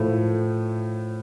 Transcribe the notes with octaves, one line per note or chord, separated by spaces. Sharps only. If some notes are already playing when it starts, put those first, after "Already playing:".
Already playing: A2 F3 A3